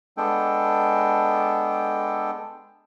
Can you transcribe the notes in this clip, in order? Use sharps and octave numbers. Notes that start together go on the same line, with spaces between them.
G#3 B3 D4 A4 G5